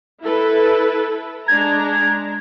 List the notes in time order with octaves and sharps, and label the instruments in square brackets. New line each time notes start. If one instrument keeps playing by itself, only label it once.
[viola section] E4 A4 B4
[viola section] G#3 D4 A#5 [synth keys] G#6